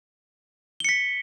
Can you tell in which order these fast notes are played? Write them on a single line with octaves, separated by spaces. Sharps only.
G7 C#7 B6